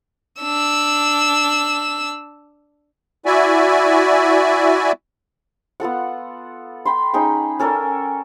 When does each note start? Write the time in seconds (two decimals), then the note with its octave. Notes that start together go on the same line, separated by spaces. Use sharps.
0.41 D4 E6
3.26 E4 F#4 D5 E5 G#5
5.80 B3 F4 A4 F#5
6.85 G5 B5 C6
7.14 C#4 D#4 G#4 G5
7.59 C#4 A4 A#4 D5